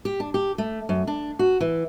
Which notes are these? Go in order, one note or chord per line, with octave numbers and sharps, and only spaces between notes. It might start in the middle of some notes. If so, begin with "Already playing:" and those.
G4
D4
G4
A3
F#2
D4
F#4
E3